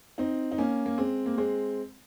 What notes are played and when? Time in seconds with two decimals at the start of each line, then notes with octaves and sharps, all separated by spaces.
0.18 C4 D#4
0.52 D#4
0.58 A#3 C#4
0.86 A#3
0.98 G#3 C4
1.26 A#3
1.38 G#3 C4